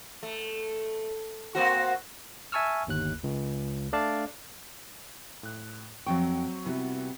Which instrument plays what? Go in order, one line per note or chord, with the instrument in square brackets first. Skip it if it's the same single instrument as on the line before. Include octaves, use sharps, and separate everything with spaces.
[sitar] A3
A#3 C4 F#4
[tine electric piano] E5 G#5 A5 C#6 E6 F6
G1 D#2 F#6
C#2
A3 D4 D5 F5 A5
[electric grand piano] A2 F#6
[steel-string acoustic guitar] F2 G5 [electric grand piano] F#3 C4 C#6
[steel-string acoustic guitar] C3 G3 B3 [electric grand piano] E4 F#4